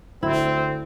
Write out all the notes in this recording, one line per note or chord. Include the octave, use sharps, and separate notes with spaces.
D2 C4 E4